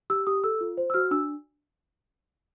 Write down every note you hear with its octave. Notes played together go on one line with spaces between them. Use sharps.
G4 E6
G4 D#6
A4 E6
F4
C5
E6
F#4 F6
D4 E6